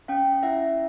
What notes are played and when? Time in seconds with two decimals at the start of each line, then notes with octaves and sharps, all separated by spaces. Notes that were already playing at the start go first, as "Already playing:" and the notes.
0.08 C#4 F5 G5
0.43 E4 E5 F#5